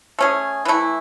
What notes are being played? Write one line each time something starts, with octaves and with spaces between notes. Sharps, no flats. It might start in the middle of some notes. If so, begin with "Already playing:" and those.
A3 C#4 G#4
E3 A3 E4